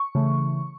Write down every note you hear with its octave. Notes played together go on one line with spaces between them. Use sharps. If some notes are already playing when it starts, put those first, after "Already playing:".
Already playing: C#6
C#3 E3 A3